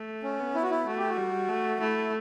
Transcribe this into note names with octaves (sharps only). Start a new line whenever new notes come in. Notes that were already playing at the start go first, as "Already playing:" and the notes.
Already playing: A3
C#4
B3
E4
F#4
E4
A3 F#4
G4
F#4
G3
A3
A3 E4